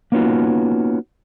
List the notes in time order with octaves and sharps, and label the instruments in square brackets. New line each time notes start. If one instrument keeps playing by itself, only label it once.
[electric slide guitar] A#3 B3 C#4 D#4 F4 F#4